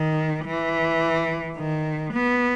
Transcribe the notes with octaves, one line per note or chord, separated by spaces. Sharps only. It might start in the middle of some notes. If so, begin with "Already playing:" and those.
Already playing: D#3
E3
D#3
B3